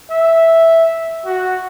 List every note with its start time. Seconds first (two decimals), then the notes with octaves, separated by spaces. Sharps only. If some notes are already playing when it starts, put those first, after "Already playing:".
0.10 E5
1.26 F#4